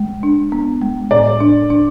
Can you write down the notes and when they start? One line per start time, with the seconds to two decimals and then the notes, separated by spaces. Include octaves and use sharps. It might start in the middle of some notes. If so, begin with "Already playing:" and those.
Already playing: G#3
0.23 D4
0.52 B3
0.82 G#3
1.11 A2 D5
1.40 D4
1.70 D4